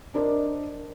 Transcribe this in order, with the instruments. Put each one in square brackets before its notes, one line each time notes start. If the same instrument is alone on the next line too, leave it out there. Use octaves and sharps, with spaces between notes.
[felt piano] D4 A#4 C5 D5 D#5